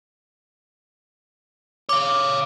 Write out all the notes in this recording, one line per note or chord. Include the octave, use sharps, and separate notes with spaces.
C#5 F5 D6